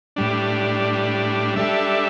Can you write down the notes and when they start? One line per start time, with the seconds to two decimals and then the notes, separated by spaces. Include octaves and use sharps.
0.16 A2 G3 D4
1.56 G3 D4 A4 E5